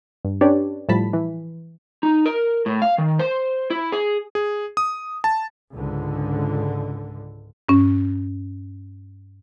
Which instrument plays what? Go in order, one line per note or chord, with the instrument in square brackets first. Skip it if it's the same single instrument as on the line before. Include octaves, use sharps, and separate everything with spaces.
[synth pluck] G2
C#4 D4 G4 B4 C#5 D5
A2 F3 G3 A5 B5 B6
E3
[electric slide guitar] D#4
A#4
A2
F5
D#3
C5
E4
G#4
[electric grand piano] G#4
D#6
A5
[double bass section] C#2 G#2 D3
[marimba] G2 C#4